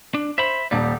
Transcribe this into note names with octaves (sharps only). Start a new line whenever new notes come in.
D4
C5 E5 B5
D#1 G3 A#3 D5